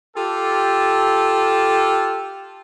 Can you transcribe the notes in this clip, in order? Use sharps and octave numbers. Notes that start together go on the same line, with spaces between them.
F4 G4 A4